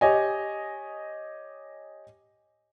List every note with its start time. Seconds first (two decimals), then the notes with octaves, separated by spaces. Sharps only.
0.01 G4 C#5 D#5 G#5